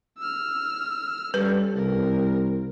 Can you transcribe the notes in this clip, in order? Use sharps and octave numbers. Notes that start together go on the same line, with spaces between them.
E6 F6
G3 C#4 A4 B4
C2 A#4